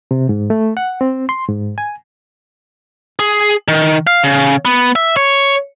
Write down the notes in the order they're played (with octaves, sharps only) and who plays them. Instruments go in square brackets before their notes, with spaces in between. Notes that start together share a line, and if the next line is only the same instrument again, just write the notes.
[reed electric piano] C3
G#2
A3
F#5
C4
C6
G#2
G#5
[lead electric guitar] G#4
D#3
F5
C#3
B3
E5
C#5